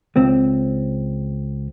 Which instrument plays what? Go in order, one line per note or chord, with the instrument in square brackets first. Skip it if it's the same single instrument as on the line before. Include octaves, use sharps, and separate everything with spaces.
[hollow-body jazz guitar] C#2 C4